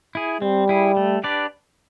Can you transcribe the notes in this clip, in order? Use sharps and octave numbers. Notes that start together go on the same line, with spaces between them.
E4 G#4
G3 C4
E4 G#4
A3
D4 G4 B4 D5